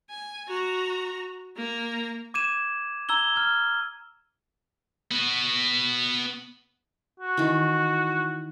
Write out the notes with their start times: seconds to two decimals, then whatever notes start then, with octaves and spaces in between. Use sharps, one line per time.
0.10 G#5
0.48 F#4 A#5
1.56 A#3 A#5
2.34 D6 G#6 D#7 E7
3.09 A#5 E6 G#6 G7
3.36 F6 G#6
5.11 B3 F#4
7.19 F#4
7.37 D#3 E3